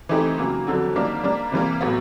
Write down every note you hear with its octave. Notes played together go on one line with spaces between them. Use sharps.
E3 A3 C4 D#4 G4
C#3 F#3 A#3
F2 D3 F#3
D#3 G3 A#3 D4
G3 A#3 D4
C3 E3 G3 A#3
A2 F#3 B3